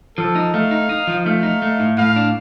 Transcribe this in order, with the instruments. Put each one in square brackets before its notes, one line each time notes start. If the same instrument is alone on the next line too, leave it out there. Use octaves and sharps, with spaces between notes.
[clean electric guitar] F3 [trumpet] A4
[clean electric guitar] D#4
[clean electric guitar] A3 [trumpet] F5
[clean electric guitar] D#4
D#4
F3
[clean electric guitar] A3 [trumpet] F5
[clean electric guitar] D#4
A3
A2
[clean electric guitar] A2 [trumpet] F5
[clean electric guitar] D4